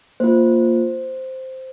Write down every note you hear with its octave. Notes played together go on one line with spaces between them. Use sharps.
A#3 F4 C5